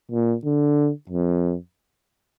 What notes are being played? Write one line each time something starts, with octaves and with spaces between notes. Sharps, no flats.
A#2
D3
F2